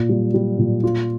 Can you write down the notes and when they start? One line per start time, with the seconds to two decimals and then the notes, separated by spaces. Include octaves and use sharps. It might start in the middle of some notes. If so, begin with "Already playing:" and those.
Already playing: A#2
0.09 G3
0.34 G3
0.58 A#2
0.84 F4